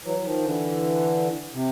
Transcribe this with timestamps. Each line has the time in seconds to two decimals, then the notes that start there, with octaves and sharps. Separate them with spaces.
0.05 E3 F#3
0.19 E3
0.24 D#3 F3
0.44 D3 E3
1.54 C3